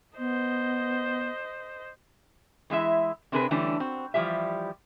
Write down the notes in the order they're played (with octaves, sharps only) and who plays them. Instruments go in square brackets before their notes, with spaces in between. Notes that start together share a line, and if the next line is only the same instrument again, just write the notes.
[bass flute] B3 [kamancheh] C5 D#5
[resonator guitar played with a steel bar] E3 G#3 E4 E5
C3 C4 D4 G#4 A#4 B4
D3 E3 G3 A3 C#4 D4
C4 F#4
E3 F3 G3 G4 E5